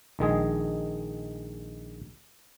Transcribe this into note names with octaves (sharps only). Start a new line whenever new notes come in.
A#1 D#3 G#3 G#4